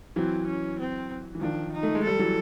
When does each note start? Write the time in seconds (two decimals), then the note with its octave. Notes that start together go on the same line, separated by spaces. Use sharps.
0.16 E3 F#3 C4
0.47 C#4
0.79 C4
1.35 E3
1.41 D#3 F3 D4
1.73 D#4
1.83 A3
1.95 G#3
2.04 G3 A4
2.19 E3 F#3